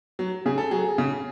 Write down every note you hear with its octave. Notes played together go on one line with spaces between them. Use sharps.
F#3
C#3 G#4
A4
F#3 G#4
C#3